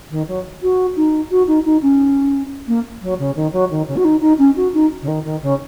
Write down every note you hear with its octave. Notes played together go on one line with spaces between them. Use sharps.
D#3
F#3
F#4
D#4
F#4
D#4
D#4
C#4
A#3
F#3
C#3
D#3
F#3
D#3
C#3
F#4
D#4
D#4
C#4
F#4
D#4
C#3
D#3
D#3
C#3